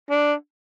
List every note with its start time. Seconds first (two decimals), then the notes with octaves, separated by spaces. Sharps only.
0.10 D4